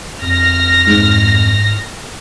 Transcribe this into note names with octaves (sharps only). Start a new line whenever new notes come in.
F2 F6 A#6
G#2